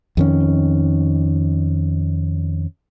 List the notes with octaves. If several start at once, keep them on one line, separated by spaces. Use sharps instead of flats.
F2 D#3 C#4